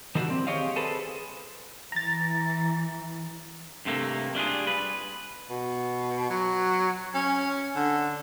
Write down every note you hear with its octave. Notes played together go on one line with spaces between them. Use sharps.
D#3 E3 G3 A#3 D4 F#4
C4
G4 G#4 C#5 D#5 F5
G#4 A4 B4 C5
E3 A#5 A6
G2 C3 A3 A#3
G3 D4 F4 G#4
B4
B2
F#3
C#4
D3